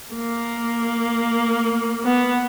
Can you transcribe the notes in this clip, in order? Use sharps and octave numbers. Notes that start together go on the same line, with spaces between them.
A#3
B3